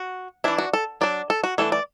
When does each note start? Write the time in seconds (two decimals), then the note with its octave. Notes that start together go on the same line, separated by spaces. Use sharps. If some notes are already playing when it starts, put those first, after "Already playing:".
Already playing: F#4
0.44 E3 D4 E4
0.58 F#4
0.73 A4
1.01 F#3 D4 D5
1.30 A4
1.44 F#4
1.58 E3 A3 D4 A4
1.72 D5